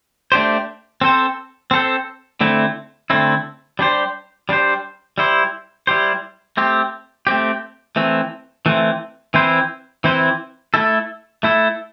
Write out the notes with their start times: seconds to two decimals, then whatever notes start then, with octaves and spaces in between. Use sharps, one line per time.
0.32 A3 D4 G4 C5
1.01 C4 A4 C5
1.71 C4 A4 C5
2.41 D3 A3 C4 E4
3.10 D3 A3 C4 E4
3.79 G3 D4 G4 C5
4.49 G3 D4 G4 C5
5.18 G3 E4 G4 C5
5.87 G3 E4 G4 C5
6.57 A3 C4 G4
7.27 A3 C4 G4
7.96 E3 A3 C4
8.66 E3 A3 C4
9.34 E3 C4 E4 C5
10.04 E3 C4 E4 C5
10.74 A3 E4 A4
11.43 A3 E4 A4